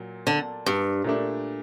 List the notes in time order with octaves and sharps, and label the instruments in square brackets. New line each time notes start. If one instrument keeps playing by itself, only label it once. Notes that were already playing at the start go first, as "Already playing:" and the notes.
Already playing: [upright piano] A#2 F#3
[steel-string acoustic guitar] D3
G2
[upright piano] A#2 A3 D4